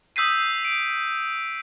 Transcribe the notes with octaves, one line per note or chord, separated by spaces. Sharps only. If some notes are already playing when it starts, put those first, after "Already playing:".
D#6 E6 G6 B6 C7 D#7
D7